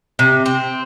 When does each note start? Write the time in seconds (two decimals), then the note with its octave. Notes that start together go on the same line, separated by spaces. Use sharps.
0.19 C3
0.46 C4